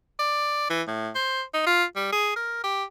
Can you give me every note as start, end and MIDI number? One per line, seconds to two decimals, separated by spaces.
0.19 0.69 74
0.70 0.82 52
0.88 1.10 45
1.15 1.43 72
1.54 1.63 63
1.66 1.84 65
1.96 2.08 55
2.12 2.32 68
2.36 2.61 70
2.64 2.84 67